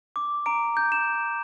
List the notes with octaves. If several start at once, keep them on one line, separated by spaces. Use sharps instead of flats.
D6
A#5 D7
G6
E7